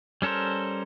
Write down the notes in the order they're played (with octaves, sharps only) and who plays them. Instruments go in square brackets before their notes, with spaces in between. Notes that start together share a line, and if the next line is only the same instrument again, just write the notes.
[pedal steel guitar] G3 C#4 A4 A#4 C5